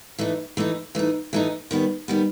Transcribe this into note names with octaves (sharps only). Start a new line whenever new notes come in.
E3 A3 D#4
E3 A3 D#4
E3 A3 D#4
E3 A3 D#4
D#3 G3 B3
D#3 G3 B3